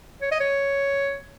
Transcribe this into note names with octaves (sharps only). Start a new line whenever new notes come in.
C#5
D#5
C#5